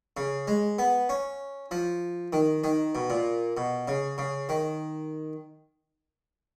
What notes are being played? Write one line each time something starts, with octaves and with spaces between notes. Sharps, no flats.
C#3
G#3
B3
C#4
F3
D#3
D#3
B2
A#2
B2
C#3
C#3
D#3